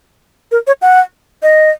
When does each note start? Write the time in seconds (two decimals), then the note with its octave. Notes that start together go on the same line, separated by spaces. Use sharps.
0.52 A#4
0.67 C#5
0.82 F#5
1.43 D#5